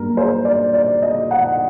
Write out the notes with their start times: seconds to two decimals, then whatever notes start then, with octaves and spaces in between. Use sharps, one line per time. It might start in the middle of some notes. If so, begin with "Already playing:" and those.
Already playing: G2 F#3 A#3 D4 A#4
0.17 C5
0.45 D5
0.74 D5
1.02 D#5
1.31 F#5